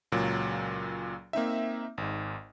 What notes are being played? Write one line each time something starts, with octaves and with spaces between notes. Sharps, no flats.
C#2 A#2 F#3
A#3 C4 D#4 E5
G#1 G#2